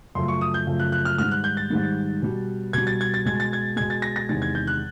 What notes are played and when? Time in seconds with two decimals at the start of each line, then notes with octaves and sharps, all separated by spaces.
0.15 F#2 C#3 F3 A3 C6
0.28 C#6
0.41 D#6
0.54 G6
0.67 F#2 C#3 F3 A3
0.79 F#6
0.92 F#6
1.05 F6
1.18 G#2 D#3 G3 F6
1.31 F#6
1.44 G6
1.57 A6
1.70 G#2 D#3 G3
2.22 B2 G3
2.73 B2 G3 G#6
2.87 A6
3.01 G#6
3.14 A6
3.25 B2 G#3 G#6
3.40 A6
3.53 G#6
3.76 B2 G#3 G#6
3.90 A6
4.02 A#6
4.16 A#6
4.29 E2 C3 D#3 G#3 A6
4.42 G#6
4.55 G6
4.67 F#6